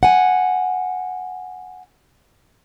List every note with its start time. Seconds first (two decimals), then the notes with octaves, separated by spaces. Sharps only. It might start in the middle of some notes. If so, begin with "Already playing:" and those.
0.03 F#5 G#5